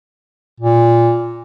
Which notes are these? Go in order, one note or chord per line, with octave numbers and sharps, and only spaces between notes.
A#2